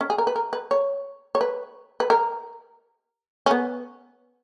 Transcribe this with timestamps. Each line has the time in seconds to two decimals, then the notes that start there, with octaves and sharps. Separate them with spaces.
0.01 C#4
0.10 G#4
0.18 A#4
0.27 B4
0.36 A#4
0.53 B4
0.71 C#5
1.35 C#5
1.41 B4
2.00 B4
2.10 A#4
3.46 C#4
3.51 B3